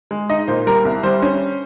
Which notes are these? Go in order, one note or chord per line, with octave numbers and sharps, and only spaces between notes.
G#3
D#4 D#5
A#2 C5
G3 A#4
C2
G3 C5
C#4